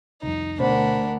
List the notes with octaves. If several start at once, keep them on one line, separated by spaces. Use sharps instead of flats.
C2 F2 D#4
D2 B2 B3 D4 A#4 C5 F#5 B5